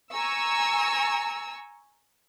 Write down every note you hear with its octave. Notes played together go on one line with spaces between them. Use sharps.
G#5 A#5 C#6 E6